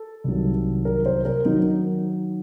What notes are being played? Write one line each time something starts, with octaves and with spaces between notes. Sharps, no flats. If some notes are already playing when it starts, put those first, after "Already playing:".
Already playing: A4
C2 C3 D#3 F#3
A#4
C5
A#4
D#3 F#3 D#4